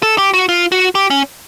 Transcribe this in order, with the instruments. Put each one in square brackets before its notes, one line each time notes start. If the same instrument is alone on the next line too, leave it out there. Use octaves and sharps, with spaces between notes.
[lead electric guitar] A4
G4
F#4
F4
F#4
G4
C#4